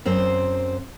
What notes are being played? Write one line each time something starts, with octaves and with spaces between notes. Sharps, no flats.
F#2 C4 C5